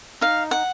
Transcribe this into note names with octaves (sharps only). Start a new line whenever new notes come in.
D#4 F5
F#5